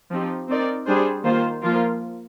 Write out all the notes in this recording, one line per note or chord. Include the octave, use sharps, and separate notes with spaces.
F3 C4 D#4 G4
C4 D#4 A#4 D5
G3 D4 G#4 C5
D#3 A#3 F4 C5
F3 A#3 F4 A#4